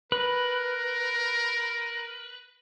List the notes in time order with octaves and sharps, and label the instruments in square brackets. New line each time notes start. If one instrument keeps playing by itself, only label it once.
[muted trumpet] A#4 [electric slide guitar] B4